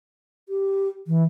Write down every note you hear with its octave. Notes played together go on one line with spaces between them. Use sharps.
G4
E3